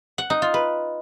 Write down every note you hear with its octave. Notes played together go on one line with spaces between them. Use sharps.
F#5
D#4
F4
B4